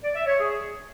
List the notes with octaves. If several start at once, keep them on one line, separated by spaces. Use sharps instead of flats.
D5
E5
C#5
G#4